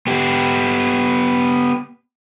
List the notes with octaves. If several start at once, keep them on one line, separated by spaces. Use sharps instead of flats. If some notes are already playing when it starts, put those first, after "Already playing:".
B3 G4